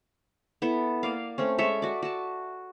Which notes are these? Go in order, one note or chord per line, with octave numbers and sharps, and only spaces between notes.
B3 E4 A4
A#3 D5 F5
A3 C4 C#4
G#3 A4 C#5 E5
F#4 D5
F#4 A5